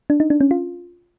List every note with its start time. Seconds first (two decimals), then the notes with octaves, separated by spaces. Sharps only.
0.10 D4
0.20 D#4
0.30 D4
0.41 C#4
0.51 F4